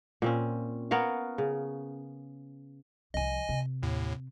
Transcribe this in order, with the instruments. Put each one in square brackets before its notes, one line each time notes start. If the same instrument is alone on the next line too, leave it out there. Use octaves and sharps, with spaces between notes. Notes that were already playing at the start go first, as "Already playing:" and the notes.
[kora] A#2 C4 C#4
B3 A#4 C#5 F5
C#3
[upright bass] C2 F3 [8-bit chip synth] D#5 G#5
[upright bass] C3
[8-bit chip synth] D#2 A2